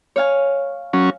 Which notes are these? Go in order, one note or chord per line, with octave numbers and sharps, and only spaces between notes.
C#5 F5 G#5
F#3 C#4